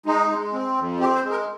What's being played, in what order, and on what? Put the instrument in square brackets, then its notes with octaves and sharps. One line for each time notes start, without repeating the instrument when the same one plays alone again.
[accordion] G#3 D#4
G#3
C4
F2
C4 G4
C5
G#3
A#4